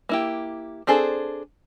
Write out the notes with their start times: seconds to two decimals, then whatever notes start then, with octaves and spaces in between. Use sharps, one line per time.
0.09 A#3 E4 G4
0.87 C4 D4 G#4 A4 C5